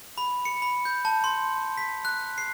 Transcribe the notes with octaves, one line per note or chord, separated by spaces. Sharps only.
B5
C#7
B5
G6
A5
C6
B6
F#6
C7